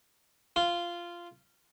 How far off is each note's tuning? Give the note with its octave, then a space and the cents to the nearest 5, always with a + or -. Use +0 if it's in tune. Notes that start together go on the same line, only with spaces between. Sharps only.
F4 -10